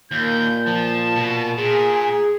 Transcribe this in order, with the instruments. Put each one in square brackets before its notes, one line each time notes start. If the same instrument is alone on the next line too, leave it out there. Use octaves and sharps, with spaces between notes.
[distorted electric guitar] D#2 [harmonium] A#2 [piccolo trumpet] G6
[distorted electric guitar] F3 [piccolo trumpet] A5
[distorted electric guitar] B2
[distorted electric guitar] A#2 [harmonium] G#4